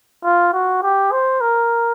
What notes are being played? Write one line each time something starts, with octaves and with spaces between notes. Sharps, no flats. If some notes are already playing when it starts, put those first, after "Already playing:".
F4
F#4
G4
C5
A#4